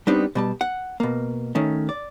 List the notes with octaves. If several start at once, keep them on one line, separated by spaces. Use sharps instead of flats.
G3 B3 C4 D4 D#4
B2 G3 A5
F#5
B2 A#3
D#3 A3 C#4
D5